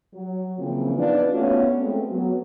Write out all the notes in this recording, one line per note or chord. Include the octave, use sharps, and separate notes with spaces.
F#3
C#3 E3 F3 A#3 C4
B3 D4 D#4 F4 B4
A3 B3 C#4 F4 F#4
G#3 A3 B3 C4
F#3 B3